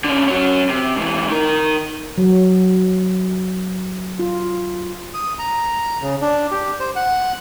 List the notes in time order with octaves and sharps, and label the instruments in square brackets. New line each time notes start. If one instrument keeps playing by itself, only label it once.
[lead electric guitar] D3 C#4
F#3 C#4
C3
G#2 E3
D#3 A#4
[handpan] F#3
F4
[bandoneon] D#6
A#5
C#3
D4
G4
C5
F#5